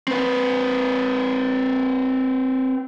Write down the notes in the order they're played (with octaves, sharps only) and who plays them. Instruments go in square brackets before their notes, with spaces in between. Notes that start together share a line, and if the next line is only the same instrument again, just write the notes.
[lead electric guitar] C4 B4